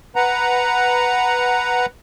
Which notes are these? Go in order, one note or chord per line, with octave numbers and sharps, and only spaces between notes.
B4 F#5 A#5